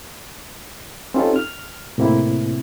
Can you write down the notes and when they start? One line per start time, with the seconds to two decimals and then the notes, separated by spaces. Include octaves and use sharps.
1.14 C4 C#4 D#4 F4 G4 A4
1.36 F6
1.98 A2 C3 A#3 C4 E4